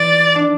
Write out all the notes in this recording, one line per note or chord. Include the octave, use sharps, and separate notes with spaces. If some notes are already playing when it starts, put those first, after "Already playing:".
Already playing: E3 D5
D4